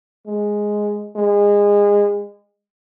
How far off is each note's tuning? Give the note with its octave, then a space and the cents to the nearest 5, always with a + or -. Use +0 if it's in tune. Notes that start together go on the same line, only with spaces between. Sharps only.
G#3 +0
G#3 -25